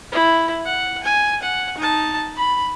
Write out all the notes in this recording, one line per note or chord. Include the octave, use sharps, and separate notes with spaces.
E4
F#5
G#5
F#5
D#4 A5
B5